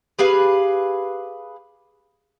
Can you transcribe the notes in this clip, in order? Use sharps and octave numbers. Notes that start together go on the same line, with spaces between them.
G4 G#4 B4 F5